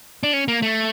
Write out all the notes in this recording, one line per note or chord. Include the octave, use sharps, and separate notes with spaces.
D4
C#4
A#3
A3